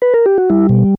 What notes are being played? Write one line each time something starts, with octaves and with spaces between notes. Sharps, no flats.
B4
A#4
G4
F#4
G3 E4
B2